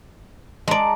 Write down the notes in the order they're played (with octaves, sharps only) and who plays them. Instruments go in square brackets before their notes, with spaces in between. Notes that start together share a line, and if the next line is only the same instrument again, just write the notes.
[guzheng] G#3 D5 [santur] A5 A#5